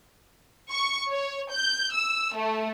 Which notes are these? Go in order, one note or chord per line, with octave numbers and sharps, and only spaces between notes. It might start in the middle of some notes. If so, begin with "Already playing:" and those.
C#6
C#5
G6
E6
A3